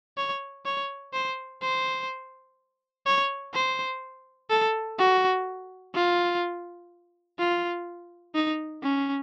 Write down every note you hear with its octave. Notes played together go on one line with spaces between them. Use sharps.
C#5
C#5
C5
C5
C#5
C5
A4
F#4
F4
F4
D#4
C#4